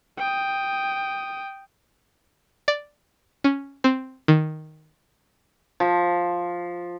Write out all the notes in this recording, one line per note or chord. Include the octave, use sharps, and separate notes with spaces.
G5 D#6
D5
C#4
C4
D#3
F3